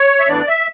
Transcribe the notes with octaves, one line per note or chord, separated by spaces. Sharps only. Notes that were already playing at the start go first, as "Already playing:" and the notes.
Already playing: C#5
E5
A2 E3 B3 D4 D5
E5